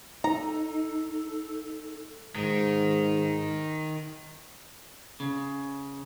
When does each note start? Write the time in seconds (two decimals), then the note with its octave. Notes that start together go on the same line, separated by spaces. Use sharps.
0.24 D#4 A4 A#5
2.35 G#2 D#3
5.20 C#3